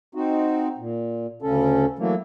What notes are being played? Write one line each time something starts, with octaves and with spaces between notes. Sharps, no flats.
C4 D#4 F#4
A#2
D2 C#3 C#4 A4
E3 F#3 A3 A#3